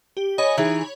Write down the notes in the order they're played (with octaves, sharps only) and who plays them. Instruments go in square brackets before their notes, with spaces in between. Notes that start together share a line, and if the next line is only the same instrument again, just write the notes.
[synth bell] G4
[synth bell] C#5 B5 [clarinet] D#5 [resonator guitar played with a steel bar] G#5
[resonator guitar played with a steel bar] E3 G#4 [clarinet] D#4